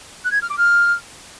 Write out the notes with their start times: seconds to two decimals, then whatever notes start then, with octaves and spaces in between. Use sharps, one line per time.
0.24 F#6
0.32 G#6
0.41 F6
0.49 D6
0.58 F6